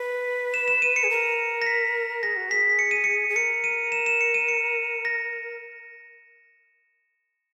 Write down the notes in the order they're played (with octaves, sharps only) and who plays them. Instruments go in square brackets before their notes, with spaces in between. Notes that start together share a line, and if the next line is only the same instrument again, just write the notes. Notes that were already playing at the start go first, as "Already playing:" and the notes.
Already playing: [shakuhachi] B4
[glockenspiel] E7
E7
D#7
C#7
[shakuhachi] G#4
A#4
[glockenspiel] A#6
B6
[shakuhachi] G#4 [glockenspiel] A#6
[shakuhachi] F#4
[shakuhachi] G#4 [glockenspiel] B6
[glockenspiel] C#7
D#7
C#7
[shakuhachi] G#4
[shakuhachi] A#4 [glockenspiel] C#7
[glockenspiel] D#7
E7
E7
C#7
D#7
C#7
A#6